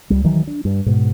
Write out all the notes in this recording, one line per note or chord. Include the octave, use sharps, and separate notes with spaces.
C#2 G3
D#3 E3 F#3
D4
G2
G#2 B2